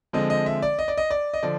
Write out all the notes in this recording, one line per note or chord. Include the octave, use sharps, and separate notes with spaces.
D3 F3 G#3 C4 D#5
D#5
E5
D5
D#5
D5
D#5
D5
D#5
D3 F3 D5